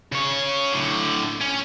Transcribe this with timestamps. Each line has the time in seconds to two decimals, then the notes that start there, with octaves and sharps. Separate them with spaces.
0.12 C#3 C#5
0.72 A2 D3
1.41 C#4